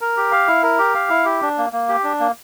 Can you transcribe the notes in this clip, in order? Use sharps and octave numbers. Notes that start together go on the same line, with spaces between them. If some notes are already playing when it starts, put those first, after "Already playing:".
A#4
G4
F5
E4
A#4
G4
F5
E4
G4
D4
A#3
A#3
G4
D4
A#3